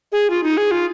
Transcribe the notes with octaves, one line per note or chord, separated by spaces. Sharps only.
G#4
F4
D#4
G#4
F4